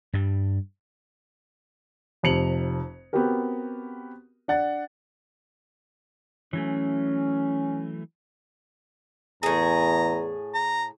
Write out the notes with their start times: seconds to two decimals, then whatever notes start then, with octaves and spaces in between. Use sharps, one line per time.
0.13 G2 G3
2.23 F1 F2 C3 C#7 F7 F#7
3.13 B3 C4 F#4 G4 A#4
4.48 D4 F#5 A6
6.53 E3 F#3 A3 C#4
9.43 E2 A2 G#4 A#5
10.54 A#5